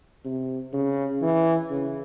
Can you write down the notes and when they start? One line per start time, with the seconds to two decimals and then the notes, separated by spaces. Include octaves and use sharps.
0.25 C3
0.73 C#3
1.22 E3
1.70 C#3